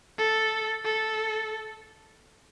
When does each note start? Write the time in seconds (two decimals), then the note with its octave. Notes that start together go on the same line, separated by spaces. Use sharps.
0.18 A4
0.85 A4